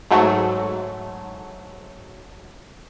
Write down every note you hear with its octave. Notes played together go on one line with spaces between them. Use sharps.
G#2 F#3 A3